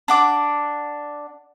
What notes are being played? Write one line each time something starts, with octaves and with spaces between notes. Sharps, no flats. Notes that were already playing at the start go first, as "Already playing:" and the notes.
D4 F#5 D6